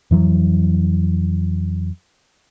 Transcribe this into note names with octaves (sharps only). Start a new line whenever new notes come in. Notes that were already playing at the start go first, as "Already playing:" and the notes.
F2 E3 F#3